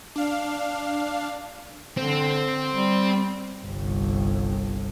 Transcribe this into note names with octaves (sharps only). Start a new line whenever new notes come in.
D4 F5
D3 C4
G3
G1 C2